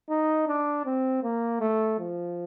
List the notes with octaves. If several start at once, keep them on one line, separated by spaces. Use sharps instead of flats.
D#4
D4
C4
A#3
A3
F3